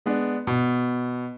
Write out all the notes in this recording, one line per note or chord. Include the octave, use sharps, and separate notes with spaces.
G#3 B3 D4
B2